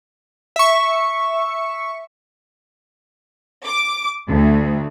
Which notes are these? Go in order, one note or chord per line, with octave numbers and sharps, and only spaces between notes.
E5 C#6
D6
D2